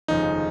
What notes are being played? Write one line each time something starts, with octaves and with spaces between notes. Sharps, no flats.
F1 D#2 C#3 F3 G#3 D#4